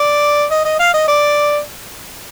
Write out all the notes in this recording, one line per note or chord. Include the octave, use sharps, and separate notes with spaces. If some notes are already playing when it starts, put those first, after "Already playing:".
Already playing: D5
D#5
D#5
F5
D#5
D5